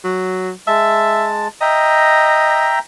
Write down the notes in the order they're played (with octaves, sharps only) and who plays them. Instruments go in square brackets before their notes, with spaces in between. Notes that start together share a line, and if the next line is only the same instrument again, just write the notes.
[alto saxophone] F#3
[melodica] G#3 A5 [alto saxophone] E5
[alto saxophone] D#5 [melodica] E5 G5 A#5